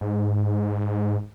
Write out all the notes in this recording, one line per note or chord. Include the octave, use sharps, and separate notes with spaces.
G#2